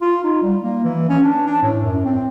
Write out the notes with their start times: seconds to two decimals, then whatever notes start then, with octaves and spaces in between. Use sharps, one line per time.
0.01 F4
0.24 D#4
0.42 G3
0.62 A#3
0.84 E3
1.09 C#4
1.23 D4
1.46 D4
1.63 A2
1.83 F#2
2.05 C4